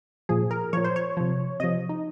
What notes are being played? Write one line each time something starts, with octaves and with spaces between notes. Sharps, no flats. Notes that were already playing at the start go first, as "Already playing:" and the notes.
A#2 F3 G#4
A#4
A#2 F3 C#5
C5
C#5
C3 F3
C3 F3 D#5
D#4